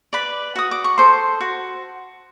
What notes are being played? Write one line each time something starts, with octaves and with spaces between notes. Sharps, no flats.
B4 D5 B5
F#4 D#6
D6
C#6
A4 C5 C6
F#4